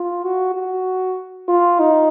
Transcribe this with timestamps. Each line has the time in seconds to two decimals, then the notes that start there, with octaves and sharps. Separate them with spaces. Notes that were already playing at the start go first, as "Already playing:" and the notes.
Already playing: F4
0.24 F#4
0.55 F#4
1.48 F4
1.80 D#4